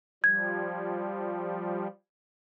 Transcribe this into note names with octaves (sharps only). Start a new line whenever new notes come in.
F3 G3 G#6